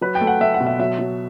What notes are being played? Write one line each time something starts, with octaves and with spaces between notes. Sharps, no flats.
F#3 B4
G5
A3
F#5
A3 E5
F#5
B2
E5
F#3 E5
F#3